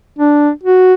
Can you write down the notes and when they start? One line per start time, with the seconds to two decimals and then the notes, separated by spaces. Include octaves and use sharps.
0.19 D4
0.63 F#4